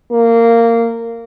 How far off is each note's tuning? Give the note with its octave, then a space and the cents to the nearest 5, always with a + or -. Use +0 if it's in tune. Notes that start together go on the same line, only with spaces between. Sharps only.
A#3 -15